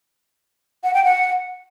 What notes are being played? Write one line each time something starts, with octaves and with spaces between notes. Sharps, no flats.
F#5
G5
F#5